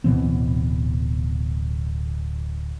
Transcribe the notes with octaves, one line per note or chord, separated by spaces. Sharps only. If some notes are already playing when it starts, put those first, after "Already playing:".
D1 B2 E3 C4